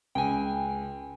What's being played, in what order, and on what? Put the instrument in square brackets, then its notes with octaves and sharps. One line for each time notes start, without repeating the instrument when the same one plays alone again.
[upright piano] C#2 [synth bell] G5 G#5